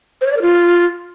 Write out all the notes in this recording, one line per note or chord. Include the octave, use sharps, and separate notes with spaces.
C5
C#5
D5
A#4
F4